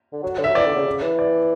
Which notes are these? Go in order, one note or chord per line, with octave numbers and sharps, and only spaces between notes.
D3
F#3
D3
F#3 E5
E3 D5
D3
C#3
C#3
E3
D5